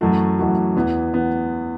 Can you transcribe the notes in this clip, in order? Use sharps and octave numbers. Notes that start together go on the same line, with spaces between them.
F#2 E3 A3 F#4
F#2 E3 A3 F#4
E2 E3 B3
E3 B3